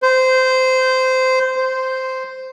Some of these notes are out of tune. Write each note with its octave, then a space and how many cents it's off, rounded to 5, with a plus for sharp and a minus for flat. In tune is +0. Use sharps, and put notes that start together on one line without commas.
C5 -15
C5 -5